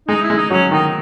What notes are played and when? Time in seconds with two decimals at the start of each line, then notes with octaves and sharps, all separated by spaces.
0.08 G#3 D#4
0.22 E4
0.30 G#3
0.36 D#4
0.50 F#3 C#4
0.71 D#3 D#4